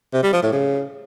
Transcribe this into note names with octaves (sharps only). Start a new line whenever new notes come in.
C3
G3
F3
A2
C#3